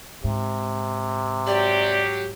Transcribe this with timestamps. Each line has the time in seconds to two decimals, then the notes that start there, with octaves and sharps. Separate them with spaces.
0.24 G#2 C3
1.47 F#3 G4 D5